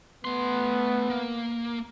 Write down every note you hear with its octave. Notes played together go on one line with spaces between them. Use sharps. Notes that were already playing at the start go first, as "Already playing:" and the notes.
A3 B3 C6
A#3